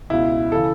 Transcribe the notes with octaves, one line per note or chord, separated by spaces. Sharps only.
C#2 B2 E4
C#3 E3 A4